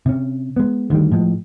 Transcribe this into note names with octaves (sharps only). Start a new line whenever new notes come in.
C3 C#4
G#3 B3
D2 D#3 G3
A2 F3 G#3